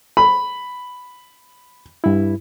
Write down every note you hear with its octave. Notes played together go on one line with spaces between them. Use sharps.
B5
G2 E4